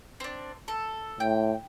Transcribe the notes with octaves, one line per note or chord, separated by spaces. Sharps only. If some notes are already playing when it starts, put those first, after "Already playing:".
C4 D4
A4
A2 G5